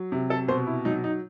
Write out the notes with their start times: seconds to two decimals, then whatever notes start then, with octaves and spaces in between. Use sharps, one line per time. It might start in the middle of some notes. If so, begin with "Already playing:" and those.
Already playing: F#3
0.12 C3
0.30 A4
0.48 B2 C5
0.67 E4
0.85 F#3 D#4
1.04 D#4